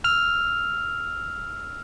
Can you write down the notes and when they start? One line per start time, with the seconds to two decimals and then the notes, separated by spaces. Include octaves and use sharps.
0.04 E6 F6 F7